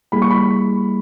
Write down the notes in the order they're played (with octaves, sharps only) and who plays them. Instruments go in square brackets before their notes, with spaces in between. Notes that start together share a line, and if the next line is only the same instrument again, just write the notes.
[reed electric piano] G3 A#3 E4 G#4 [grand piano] B5
[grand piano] C#6
B5